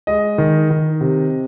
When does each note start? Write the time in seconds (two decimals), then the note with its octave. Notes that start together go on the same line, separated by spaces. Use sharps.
0.07 G#3 D#5
0.38 D#3
0.70 D#3
1.01 C3